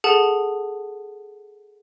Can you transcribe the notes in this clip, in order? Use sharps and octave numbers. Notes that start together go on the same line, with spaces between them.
G#4 A4 F#5 A5